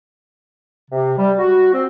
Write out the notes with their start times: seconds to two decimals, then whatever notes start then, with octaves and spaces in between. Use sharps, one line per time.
0.90 C3
1.17 G3
1.39 F#4
1.73 C4